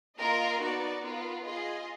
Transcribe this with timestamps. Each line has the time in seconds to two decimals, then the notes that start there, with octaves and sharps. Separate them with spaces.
0.18 A#3 F4 A#4 D#5
0.60 B3 D#4 F#4 D5
1.02 B3 F4 A#4
1.44 F4 G#4 D#5